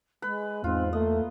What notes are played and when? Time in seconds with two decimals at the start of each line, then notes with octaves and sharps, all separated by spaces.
0.22 G#3 B4
0.64 E2 G#2 C4 F4
0.93 A3 A#3 D#5